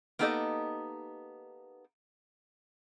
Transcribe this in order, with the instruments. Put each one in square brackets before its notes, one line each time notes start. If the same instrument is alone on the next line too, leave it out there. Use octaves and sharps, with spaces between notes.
[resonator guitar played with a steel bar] A#3 B3 D#4 G4 A4 D#5